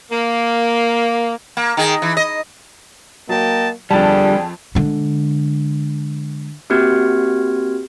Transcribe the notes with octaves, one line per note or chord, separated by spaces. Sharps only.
A#3
A#3
D#3 G#4
E3
D#5
F#3 A#3 D#5 G5 A5
F2 D3 G3 G#4 D5 G5 A5
D3 G#3
A#3 C4 F#4 G4 F6 G#6